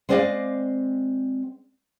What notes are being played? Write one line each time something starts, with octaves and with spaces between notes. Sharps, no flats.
G#3 C4 C5 D5 D#5 F5